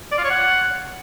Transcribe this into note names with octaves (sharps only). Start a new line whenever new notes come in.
D5
F4
C#5
F#5